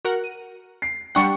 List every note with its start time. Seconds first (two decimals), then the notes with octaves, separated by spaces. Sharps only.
0.05 F#4 A#4 F#5
0.24 D#7
0.82 C7
1.15 G3 D4 F#5 G5 C#6 C#7